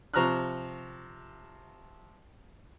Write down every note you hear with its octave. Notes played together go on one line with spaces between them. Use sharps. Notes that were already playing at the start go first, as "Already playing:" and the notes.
C3 F3 A#5 C#6 F6 F#6